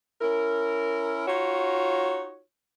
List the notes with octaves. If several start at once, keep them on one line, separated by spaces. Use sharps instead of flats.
C#4 E4 A#4
D#4 F4 F#4 C#5